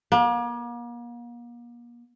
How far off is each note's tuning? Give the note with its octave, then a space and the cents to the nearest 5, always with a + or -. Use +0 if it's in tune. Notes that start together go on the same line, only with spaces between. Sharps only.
A#3 +40